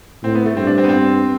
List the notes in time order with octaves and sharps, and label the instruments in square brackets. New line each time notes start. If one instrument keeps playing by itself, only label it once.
[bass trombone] A2 [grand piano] C4
[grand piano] B3
A3
[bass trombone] G2 [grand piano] C4
[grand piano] D4
C4
B3
C4